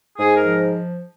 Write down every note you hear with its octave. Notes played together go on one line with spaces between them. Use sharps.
G#2 G#4
A#4
F3